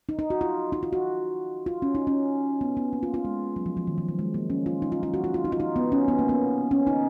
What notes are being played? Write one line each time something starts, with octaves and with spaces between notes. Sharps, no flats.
D#4
D#4
F#4
F4
D#4
F4
F#4
F4
C#4
D#4
C#4
B3
B3
A#3
F4
F4
G#3
F#3
F3
F3
D#3
F3
F#3
G#3
A#3
C#4
F4
D#4
F4
F4
F#4
F4
F4
D#4
F4
D#4
B3
C#4
B3
A#3
B3
C#4
D#4